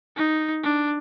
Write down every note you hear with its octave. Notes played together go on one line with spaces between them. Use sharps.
D#4
D4